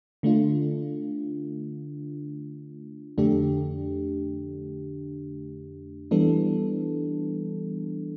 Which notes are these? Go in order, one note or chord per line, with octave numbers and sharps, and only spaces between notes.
D3 A3 D4 F4
F2 D3 A3 D4 G4
E3 G3 B3 D4 A4